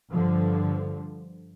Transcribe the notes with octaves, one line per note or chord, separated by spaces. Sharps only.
G2 D3 F3